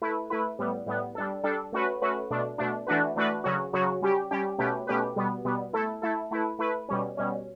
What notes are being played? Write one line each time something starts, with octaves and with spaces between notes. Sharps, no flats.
A3 E4 B4
A3 E4 B4
A2 G3 B3
A2 G3 B3
G3 D4 A4
G3 D4 A4
A3 C#4 F#4 B4
A3 C#4 F#4 B4
B2 A3 D4
B2 A3 D4
E3 A3 D4 F#4 B4
E3 A3 D4 F#4 B4
C#3 F#3 C#4 F#4
C#3 F#3 C#4 F#4
G3 C#4 G4
G3 C#4 G4
B2 A3 C#4 G4 B4
B2 A3 C#4 G4 B4
B2 G3 B3
B2 G3 B3
A3 E4 A4
A3 E4 A4
A3 E4 B4
A3 E4 B4
B2 G3 C#4
B2 G3 C#4